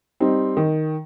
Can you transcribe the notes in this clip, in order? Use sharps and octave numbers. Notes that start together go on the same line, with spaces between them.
G3 C4 D#4
D#3